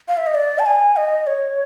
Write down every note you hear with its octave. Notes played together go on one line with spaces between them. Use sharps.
F5
E5
D#5
D5
A5
G#5
D#5
C#5